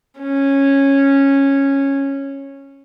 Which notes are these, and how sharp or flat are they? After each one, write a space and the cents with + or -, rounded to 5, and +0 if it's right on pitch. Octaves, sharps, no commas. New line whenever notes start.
C#4 -10